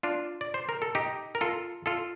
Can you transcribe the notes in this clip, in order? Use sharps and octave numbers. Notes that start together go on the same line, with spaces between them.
D4 F4
D5
C5
A#4
A4
D#4 G4
A#4
F4 A4
F4 A4